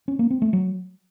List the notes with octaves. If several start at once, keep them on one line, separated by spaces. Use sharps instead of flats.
C#4
A#3
C4
A3
F#3